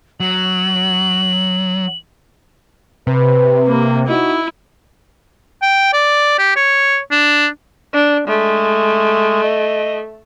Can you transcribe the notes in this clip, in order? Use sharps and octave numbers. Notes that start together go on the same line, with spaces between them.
F#3 F#7
C3 B4
A#3
D#4 E4 F#4 D#5
G5
D5
G4
C#5
D4
D4
G#3 A3
D#5